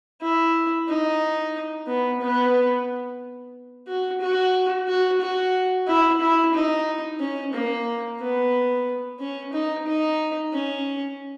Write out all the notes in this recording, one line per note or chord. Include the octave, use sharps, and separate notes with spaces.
E4
D#4
B3
B3
F#4
F#4
F#4
F#4
E4
E4
D#4
C#4
A#3
B3
C#4
D#4
D#4
C#4